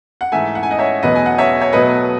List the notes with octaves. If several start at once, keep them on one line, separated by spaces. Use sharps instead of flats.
F#5
G#2 E3 A3 E5 G#5
F#5
G#5
D#5 F#5
C#5 E5
E2 B2 F#3 A3 B4 D#5
G#5
F#5
C#5 E5
C#5
B2 F#3 A3 B4 D#5